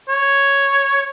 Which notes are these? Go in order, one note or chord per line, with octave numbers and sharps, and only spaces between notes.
C#5